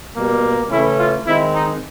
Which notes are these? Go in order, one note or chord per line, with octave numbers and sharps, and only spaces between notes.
B2 G3 A#3
C#3 E3 A3 C#4 E4
F4
D#3 G#3 C4 E4
D#4